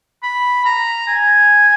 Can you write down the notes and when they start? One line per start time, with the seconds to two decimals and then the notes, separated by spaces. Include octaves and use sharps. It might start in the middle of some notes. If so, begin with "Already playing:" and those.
0.23 B5
0.65 A#5
1.08 G#5